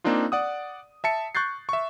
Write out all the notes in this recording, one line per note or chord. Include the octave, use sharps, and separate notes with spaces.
A#3 C4 D4 D#4 F4
D5 F#5 D#6
E5 A5 C#7
C#6 F#6 G6 A6 C7
E5 C#6